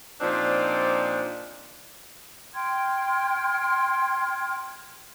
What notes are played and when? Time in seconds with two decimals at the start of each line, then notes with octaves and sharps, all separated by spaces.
0.20 A#2 F3 C4 D4 D#4 D5
2.54 G5 C6 F6 G#6